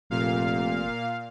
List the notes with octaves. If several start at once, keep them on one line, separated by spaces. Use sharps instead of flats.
F1 A#2 F5